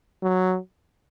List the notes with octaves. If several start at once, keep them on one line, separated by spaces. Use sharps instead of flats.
F#3